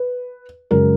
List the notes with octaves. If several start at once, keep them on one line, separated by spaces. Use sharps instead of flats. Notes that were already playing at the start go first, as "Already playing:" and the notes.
Already playing: B4
F#2 C#3 G#3 C#4 A#4